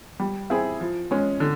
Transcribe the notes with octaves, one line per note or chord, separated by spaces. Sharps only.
G3
C4 E4 G#4
F3
G#3 C#4
D3